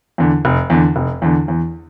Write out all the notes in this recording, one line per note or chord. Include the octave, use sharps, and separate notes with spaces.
E2 D3
F1
E2 D3
F1
E2 D3
E2